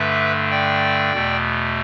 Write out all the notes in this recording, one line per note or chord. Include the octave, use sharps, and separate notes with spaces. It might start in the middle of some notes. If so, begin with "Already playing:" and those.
Already playing: G2 D3 A3 B4 E5
D5 G5
E2 B2 A3